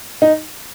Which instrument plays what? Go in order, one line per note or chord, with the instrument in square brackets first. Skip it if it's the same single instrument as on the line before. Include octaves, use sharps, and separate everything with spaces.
[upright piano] D#4